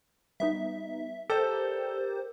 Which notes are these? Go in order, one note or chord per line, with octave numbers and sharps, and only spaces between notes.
G3 B3 D#4 E5
G4 A4 A#4 C5 D5